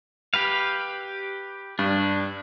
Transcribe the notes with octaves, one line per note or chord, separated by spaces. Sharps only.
G4 B4 F5
G2 D4